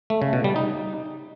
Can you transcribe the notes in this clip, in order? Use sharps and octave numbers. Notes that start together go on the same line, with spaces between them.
A3
C#3
B2
G3
D#4